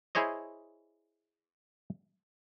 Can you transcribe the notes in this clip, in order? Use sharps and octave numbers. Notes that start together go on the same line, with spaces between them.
E4 G#4 C5 C#5 D#5